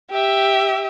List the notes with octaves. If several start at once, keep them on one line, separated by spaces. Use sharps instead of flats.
G4 E5